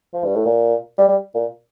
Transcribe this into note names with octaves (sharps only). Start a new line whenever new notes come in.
F3
G2
A2
A#2
G3
G3
A#2